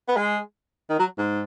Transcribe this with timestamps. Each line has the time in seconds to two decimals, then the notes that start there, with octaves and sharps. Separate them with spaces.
0.08 B3
0.16 G#3
0.89 D#3
0.99 F#3
1.18 G#2